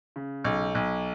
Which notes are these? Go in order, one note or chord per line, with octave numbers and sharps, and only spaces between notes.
C#3
B1
B1